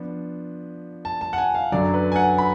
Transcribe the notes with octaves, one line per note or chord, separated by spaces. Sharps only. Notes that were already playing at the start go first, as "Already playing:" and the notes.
Already playing: F3 B3 D4
A5
A5
F#5
G#5
F5
F#2 D3 F#3 D5
B4
G#5
F#5
B5